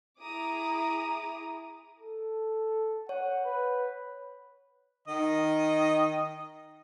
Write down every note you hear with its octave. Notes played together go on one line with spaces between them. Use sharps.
E4 G#4 A#5 D6 D#6
A4
C#5 F#5
B4
D#3 D#5